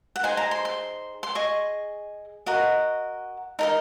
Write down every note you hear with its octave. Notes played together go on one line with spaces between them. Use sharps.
F#5
D#4 G#4 C5 G#5
A#5
C6
C6
C6
G#4 D#5 C#6
F#4 A#4 D#5 F#5
D#4 A#4 D#5